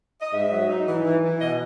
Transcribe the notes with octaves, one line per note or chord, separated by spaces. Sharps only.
D#5
G#2 E5
F#3
D#4
E3
E3
E3
B2 D#5